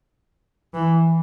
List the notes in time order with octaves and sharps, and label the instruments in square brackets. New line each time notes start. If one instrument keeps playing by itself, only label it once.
[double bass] E3